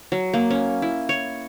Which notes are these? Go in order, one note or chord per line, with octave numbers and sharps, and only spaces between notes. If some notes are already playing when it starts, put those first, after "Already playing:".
F#3
A#3
C#4
E4
C#5